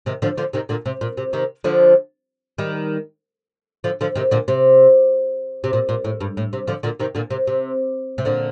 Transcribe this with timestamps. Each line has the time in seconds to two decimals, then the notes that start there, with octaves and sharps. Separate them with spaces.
0.06 C3 D#3
0.22 D3 F3
0.37 D3 F3
0.53 C3 D#3
0.69 A#2 D3
0.86 C3
1.01 A#2
1.17 C3
1.33 C3 D#3
1.64 D3 F3
2.58 D#3 G3
3.84 D3 F3
4.01 D3 F3
4.15 C3 D#3
4.31 A#2 D3
4.48 C3
5.64 C3
5.73 A#2
5.89 A#2
6.04 A2
6.21 G2
6.37 A2
6.53 C3
6.67 D3 F3
6.83 A#2 D3
7.00 C3 D#3
7.15 A#2 D3
7.30 C3
7.47 C3
8.18 C3
8.25 A#2 D3